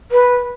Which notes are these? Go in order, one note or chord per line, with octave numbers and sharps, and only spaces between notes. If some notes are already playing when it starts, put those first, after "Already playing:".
B4